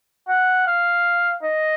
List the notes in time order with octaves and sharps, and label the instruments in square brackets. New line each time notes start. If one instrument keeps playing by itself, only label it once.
[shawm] F#5
F5
D#5